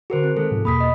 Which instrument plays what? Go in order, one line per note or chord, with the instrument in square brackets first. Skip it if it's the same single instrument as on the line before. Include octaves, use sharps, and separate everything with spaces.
[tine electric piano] D3 F#4 [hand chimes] G#4 A#4 C5
[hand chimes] C4
[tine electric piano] D#3 G#3 [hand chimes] G#4 A4
[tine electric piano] G#2 C3 F3
[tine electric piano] E2 B2 A#3 [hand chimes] B5 D#6 B6
[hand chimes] D#5